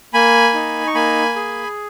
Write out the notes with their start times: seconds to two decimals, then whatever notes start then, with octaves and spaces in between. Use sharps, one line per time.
0.14 A#3 G#5 B5
0.54 D#4
0.87 C#6
0.95 A#3 G#5 B5
1.36 G#4